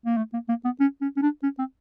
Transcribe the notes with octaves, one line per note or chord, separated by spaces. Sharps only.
A#3
A3
A#3
A#3
B3
C#4
C#4
C#4
D4
C#4
C4